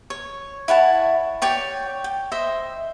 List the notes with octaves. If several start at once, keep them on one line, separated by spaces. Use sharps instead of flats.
C#5
E4 C#5 F#5 A5
G4 C#5 D5 G5
G5
C5 D#5 E5